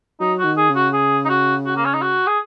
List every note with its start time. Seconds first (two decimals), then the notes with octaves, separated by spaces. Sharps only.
0.20 F#3 D#4
0.38 F#4
0.45 D#3
0.57 G#4
0.69 C#3
0.75 F#4
0.93 G#4
1.25 D#4
1.29 F#4
1.66 F#4
1.76 A#3
1.85 C#4
1.94 D#4
2.02 F#4
2.27 G#4